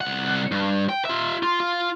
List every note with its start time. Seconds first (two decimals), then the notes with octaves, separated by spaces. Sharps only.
0.01 C2 F#5
0.52 G2
0.89 G5
1.05 F4 E5
1.43 F4
1.60 F4